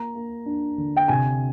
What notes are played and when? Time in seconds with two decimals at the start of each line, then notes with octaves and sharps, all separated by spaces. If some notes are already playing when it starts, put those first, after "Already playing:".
Already playing: A#3 A#5
0.15 A#3
0.46 D4
0.78 D3
0.97 G5
1.08 C3 G#5